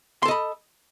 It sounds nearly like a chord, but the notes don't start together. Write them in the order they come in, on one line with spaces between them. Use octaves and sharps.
C6 A4 D#5 B5